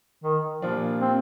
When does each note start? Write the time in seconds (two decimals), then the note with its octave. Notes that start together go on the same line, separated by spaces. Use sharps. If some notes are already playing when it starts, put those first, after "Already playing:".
0.24 D#3
0.62 A#2 F3 G3 D4 F4
1.01 C4